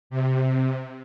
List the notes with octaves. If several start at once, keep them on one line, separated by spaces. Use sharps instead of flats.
C3